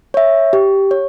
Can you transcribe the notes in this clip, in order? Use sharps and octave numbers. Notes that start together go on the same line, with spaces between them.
C#5 E5
G4
C#5